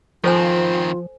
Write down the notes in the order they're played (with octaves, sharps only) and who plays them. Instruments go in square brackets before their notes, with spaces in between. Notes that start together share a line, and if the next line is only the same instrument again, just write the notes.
[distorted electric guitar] D#3 C4 [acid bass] F3 [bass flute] F4 [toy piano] A4 C5 G#5